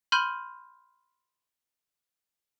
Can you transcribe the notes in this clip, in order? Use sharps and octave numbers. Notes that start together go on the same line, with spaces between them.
B5 C6 F6 G6 D#7 F#7